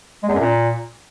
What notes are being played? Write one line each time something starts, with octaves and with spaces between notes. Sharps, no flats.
G#3
E2
F#2
A#2